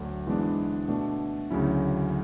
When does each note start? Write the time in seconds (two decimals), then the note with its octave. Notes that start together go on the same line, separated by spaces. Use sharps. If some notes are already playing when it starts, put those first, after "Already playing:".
Already playing: D2 D3 F#3
0.27 G#2 E3 G#3 B3 D4
0.88 B2 A3 D4
1.50 D2 C#3 F#3 C#4 E4